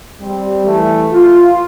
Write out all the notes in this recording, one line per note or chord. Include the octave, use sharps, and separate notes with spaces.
G3 C4
E3 A3
F4